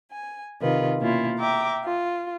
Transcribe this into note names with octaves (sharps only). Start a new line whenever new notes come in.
G#5
C3 D#3 F4 B4
B2 A#3 C#4 E4 F4
E5 G5 A#5 D6
F4